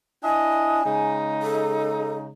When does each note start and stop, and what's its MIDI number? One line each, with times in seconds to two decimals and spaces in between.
0.24 0.83 62
0.24 0.83 64
0.24 0.83 75
0.24 1.12 80
0.85 2.30 49
0.85 2.30 56
0.85 2.30 63
1.42 2.14 69